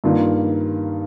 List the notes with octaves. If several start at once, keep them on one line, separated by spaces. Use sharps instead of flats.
G2 D#3 A#3 F4